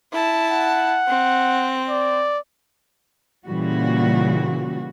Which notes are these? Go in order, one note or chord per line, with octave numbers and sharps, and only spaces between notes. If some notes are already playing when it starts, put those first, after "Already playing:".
E4 A5
F#5
C4
D5
A#2 C#3 E3 G3 F#4